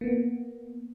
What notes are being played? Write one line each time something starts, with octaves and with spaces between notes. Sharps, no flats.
A#3 B3